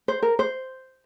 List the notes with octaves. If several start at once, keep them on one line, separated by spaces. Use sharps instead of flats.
C5
A#4
C5